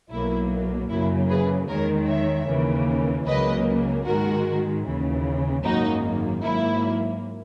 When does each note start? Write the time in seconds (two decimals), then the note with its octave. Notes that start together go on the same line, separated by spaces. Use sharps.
0.10 B1 B2 F#3 A#3 E4
0.89 F#2 C#3 F#3 A#3 E4
1.29 G#4 B4
1.68 E2 D#3 G#3 A#4 C#5
2.08 C#5 E5
2.48 D#2 C#3 E3 A#3
3.27 C#2 C#3 F#3 A#3 B4 D#5
4.06 G#2 D#3 G#3 F#4 A#4
4.85 D#2 C#3 E3
5.64 G#1 F#2 D#3 A#3 D#4 F#4
6.43 G#2 F#3 A#3 E4